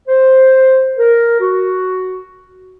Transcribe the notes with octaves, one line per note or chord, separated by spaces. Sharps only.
C5
A#4
F#4